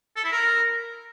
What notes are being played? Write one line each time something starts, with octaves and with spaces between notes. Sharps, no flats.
A4
E4
A#4